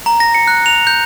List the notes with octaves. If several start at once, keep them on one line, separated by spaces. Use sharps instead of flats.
A#5
A#6
C#7
F#6
F7
G6